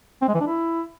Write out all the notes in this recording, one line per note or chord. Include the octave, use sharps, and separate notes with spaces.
C4
G#3
E3
D4
E4